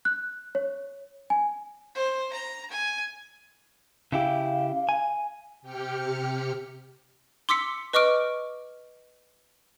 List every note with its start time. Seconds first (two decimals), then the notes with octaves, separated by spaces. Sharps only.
0.05 F#6
0.55 C#5
1.30 G#5
1.95 C5
2.33 A#5
2.70 G#5
4.12 C#3 E4 G4 F5
4.89 G#5
5.62 C3 G4 G5 F6 C#7
7.49 C6 D6 E6 B6 C#7
7.93 B4 D#5 C#6 D6 F6 D7